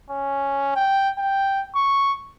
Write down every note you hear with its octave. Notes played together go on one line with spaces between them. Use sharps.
C#4
G5
G5
C#6